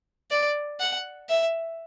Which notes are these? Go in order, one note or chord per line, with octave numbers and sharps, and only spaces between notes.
D5
F#5
E5